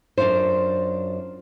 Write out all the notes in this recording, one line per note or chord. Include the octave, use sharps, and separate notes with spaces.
F#2 D4 F4 F#4 C5